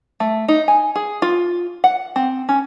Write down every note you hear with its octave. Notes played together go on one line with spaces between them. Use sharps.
A3
D#4
G#5
G#4
F4
F#5
C4
C#4